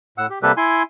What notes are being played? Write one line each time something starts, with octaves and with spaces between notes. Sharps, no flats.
A2 F#5 E6
G4
C3 G3 A#3 G4 A4 B4
E4 G#5 C6